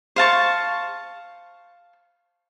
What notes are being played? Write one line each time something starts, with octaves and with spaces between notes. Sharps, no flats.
C5 F5 A5 C#6